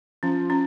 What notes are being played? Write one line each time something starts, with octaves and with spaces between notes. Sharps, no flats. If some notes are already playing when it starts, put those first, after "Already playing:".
F3 C#4
C#4